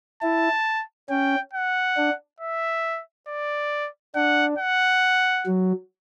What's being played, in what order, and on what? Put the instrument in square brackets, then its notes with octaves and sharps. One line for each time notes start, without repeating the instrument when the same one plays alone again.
[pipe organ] E4 [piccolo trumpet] A5
[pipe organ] C#4 [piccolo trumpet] G5
[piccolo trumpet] F#5
[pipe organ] D4
[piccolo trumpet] E5
D5
[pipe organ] D4 [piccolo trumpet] F#5
[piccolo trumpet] F#5
[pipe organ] F#3